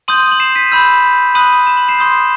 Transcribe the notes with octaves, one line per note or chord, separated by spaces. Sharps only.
C6 D#6 G6 D#7 F#7
F#7
C7 E7
B6 D#7
B5 E6 G6
B5 D#6 F#6 D#7 F#7
E7
F#7
C7 E7
C6 D#6 G6